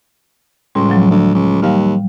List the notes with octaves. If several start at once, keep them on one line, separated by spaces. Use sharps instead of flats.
C#2 A2 G3 C6
F3 F#3
D2
C#2
D#2 G3 F5 F6